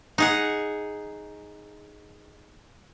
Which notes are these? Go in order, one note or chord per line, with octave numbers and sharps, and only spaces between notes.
D#4 G#4 F#5